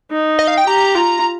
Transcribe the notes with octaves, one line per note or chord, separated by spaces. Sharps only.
D#4
D#5
F5
G5
G4 A#5
F4